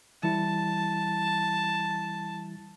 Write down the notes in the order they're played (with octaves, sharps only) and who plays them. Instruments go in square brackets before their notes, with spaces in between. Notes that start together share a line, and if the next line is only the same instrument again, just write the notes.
[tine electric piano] E3 G3 E4 [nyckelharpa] A5